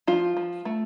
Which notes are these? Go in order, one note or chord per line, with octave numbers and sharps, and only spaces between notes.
F3 F4
F3
A3